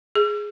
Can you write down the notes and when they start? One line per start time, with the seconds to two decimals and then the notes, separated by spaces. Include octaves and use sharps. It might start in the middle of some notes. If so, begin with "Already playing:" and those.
0.15 G#4